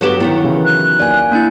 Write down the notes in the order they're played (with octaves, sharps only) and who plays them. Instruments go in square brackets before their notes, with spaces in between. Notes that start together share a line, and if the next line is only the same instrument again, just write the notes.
[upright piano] G1 E7 G7 [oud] F#3 B3 G4
[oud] D#3 F#3 B3 [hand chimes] E4
[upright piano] C#3 E3
[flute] F#6
[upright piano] D#2 [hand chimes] D5 G#5
[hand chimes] A#3 D4 E4 [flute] G6